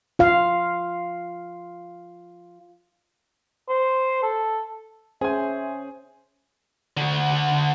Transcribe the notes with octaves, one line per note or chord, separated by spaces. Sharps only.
F4 F5
C5
A4
C#4 G#4 C5 E5 G#5
D3 F#4